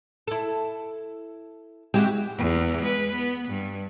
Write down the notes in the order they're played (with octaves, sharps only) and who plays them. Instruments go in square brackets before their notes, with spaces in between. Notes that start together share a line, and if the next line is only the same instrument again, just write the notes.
[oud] E4 A4
[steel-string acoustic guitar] G#3 G4 [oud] C4 E4 F#4
[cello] E2
G#3 B4
B3
G2